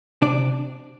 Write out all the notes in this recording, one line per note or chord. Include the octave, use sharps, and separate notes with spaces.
C3 D4 D5